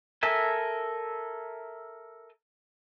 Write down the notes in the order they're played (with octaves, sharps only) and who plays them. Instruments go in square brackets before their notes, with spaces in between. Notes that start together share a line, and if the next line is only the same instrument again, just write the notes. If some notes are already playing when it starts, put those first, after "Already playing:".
[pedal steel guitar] A4 A#4 E5 G#5